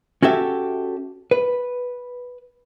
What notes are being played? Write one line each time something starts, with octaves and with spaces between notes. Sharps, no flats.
C#4 F#4 G4 A4 E5
B4